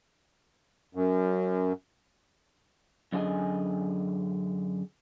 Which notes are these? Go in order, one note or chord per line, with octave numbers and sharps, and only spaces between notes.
F#2
F#2 D3 F4 G#4 D#5 G#5